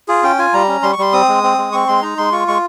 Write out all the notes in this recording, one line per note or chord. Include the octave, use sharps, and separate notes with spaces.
F4 G#4
C#4 G5
F4 G#5
G3 A#5
C#4
G3 C6
C#6
G3 C6
C4 D#6
G#3
C4
G#3
C4 C#6
G#3 C6
D#4 A#5
G#3 C6
F4 C#6
G#3 C#6